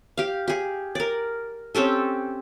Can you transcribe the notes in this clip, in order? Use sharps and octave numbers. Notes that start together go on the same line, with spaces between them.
G4 F5
G4 G#4
A#4 D5
C4 C#4 G4 A4